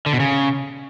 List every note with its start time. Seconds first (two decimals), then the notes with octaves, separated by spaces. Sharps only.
0.06 D3
0.13 B2
0.20 C#3